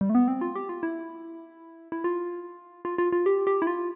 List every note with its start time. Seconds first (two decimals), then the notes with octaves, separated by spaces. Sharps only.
0.01 G3
0.09 A3
0.15 B3
0.28 C4
0.41 F4
0.55 G4
0.69 F4
0.83 E4
1.92 E4
2.04 F4
2.85 F4
2.98 F4
3.12 F4
3.26 G4
3.47 G4
3.62 E4
3.67 F4